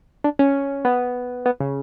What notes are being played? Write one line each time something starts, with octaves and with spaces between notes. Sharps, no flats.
D4
C#4
B3
B3
C#3